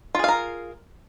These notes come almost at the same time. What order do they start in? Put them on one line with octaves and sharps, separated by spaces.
F4 G#4 F5 A#4